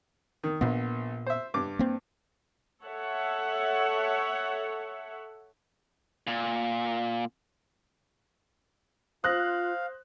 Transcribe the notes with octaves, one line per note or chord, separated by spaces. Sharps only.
D#3
A#1 A#2 B3
C5 E5
G2 D6
A#3 C4
A4 C#5 E5 F#5
A#2
F4 C5 F5 D#6 F#6 A#6